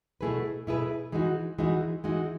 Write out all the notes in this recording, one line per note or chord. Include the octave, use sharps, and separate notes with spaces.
B2 A3 E4 G#4 B4
B2 A3 E4 G#4 B4
E3 G#3 D#4 F#4
E3 G#3 D#4 F#4
E3 G#3 D#4 F#4